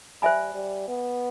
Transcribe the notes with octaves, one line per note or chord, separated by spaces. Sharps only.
G3 C5 E5 G#5 B5
G3
B3